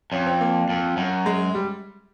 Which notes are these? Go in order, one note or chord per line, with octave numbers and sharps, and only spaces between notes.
F2 C#4
C4
A#3
F2
F#2
G#3
G3